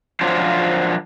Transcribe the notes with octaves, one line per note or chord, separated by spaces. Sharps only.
F3 F#3 D4 F4 C5 C#5